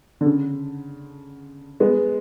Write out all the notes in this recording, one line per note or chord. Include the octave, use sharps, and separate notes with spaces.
D3
C#3
G#3 B3